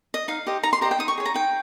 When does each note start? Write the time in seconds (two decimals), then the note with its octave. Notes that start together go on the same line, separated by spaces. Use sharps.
0.14 D#5
0.28 D#4 F5
0.47 G4 C5 D#5
0.63 D#4 A#5
0.73 C6
0.81 G4 C5 D#5 A#5
0.91 G5
0.99 D#4 D#6
1.08 C#6
1.18 G#4 C#5
1.26 A#5
1.34 D#4 G5